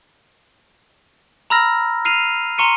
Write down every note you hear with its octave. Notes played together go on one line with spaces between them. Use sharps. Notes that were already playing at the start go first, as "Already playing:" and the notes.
A#5 B5 E6 F6 A#6
F6 C7 D#7 F7
A#5 C6 C#6 C#7 D#7